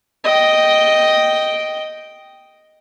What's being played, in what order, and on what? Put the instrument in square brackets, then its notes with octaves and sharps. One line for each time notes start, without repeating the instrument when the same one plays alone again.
[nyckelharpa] D#5 G5